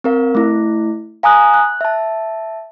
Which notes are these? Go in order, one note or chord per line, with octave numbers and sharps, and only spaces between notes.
C4 A#4 F5
A3 E4
F5 G#5 A#5 D#6 F#6
F#6
E5 A5